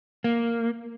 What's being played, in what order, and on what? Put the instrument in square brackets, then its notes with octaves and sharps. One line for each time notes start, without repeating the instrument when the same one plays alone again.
[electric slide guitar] A#3